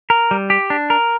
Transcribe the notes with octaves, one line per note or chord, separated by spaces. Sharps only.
A#4
G3
G4
D4
A#4